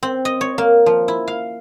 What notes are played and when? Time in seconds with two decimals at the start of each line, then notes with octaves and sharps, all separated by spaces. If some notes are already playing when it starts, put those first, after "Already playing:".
0.03 C4
0.25 D#5
0.41 C#5
0.58 A#3
0.86 F3
1.08 E4
1.27 F5